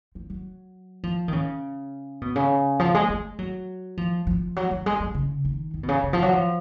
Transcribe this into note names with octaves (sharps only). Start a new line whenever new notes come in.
F3
F#3
F3
D#3
C#3
B2
C#3
F3
G#3
G#3
F#3
F3
F3
F#3
F#3
G#3
F#3
C#3
D#3
D#3
B2
C#3
C#3
F3
F#3
F3